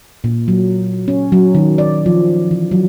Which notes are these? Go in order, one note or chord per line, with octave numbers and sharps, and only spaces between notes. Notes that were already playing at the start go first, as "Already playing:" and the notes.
A#2
F#3
C#4
F#3
D#3
D5
F3
E3
F#3